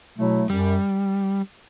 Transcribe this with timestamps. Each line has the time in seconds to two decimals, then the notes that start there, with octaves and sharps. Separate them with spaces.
0.17 B2 F#3 A3 E4
0.50 F#2 G3